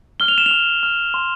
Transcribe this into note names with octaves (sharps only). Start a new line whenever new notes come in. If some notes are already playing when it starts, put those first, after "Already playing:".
F6 G7
F7
E7
F7
F6
F6
C6